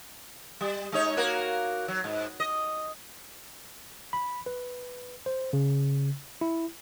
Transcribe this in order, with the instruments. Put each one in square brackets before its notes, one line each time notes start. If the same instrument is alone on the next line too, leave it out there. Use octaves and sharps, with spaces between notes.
[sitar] G3
G#3 D#4 C#5
A#3 F#4 A#4
F#3
G#2
D#5
[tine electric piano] B5
B4
C5
C#3
E4